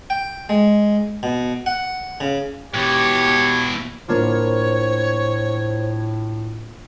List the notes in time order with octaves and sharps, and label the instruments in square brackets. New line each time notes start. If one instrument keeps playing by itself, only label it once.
[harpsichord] G5
G#3
B2
F#5
C#3
[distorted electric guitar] B2 E3 [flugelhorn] G4 [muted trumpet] C#5
[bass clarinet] A2 [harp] A#3 D4 F4 [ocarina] C5 [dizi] C#5